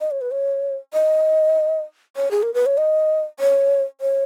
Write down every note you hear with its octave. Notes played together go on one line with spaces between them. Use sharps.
D#5
C#5
B4
C#5
D#5
C#5
G#4
A#4
B4
C#5
D#5
C#5
C#5